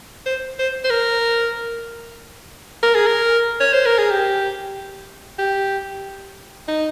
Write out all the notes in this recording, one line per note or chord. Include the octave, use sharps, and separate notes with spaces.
C5
C5
C5
A#4
A#4
G#4
A#4
C#5
C5
A#4
G#4
G4
G4
D#4